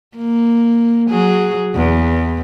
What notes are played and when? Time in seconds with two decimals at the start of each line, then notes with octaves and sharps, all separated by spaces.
0.17 A#3
1.10 F#3 G#4
1.75 E2